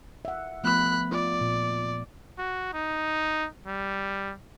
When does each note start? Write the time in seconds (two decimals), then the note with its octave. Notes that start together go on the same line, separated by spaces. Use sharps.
0.25 E5 F#5
0.64 F3 A3 B3 B5 F#6
1.12 F4 D5
1.41 A#2
2.38 F#4
2.73 D#4
3.66 G3